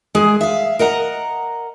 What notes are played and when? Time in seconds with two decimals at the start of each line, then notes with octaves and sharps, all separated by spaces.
0.15 G#3 G#4
0.41 E5 F5
0.79 A#4 D#5 F#5 A#5